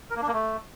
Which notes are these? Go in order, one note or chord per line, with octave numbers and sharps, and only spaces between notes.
A#4
A#3
D4
A#3
A3